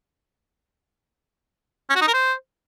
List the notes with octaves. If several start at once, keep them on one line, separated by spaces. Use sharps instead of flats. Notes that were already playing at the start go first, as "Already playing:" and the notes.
C#4
F#4
D#4
A#4
C5